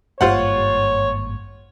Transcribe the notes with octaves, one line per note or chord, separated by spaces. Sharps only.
G#1 G2 A#3 F4 C5 C#5 F#5